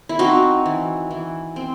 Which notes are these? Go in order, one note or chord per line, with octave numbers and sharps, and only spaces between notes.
E4
C4 D#4 F#4
E3
E3
C4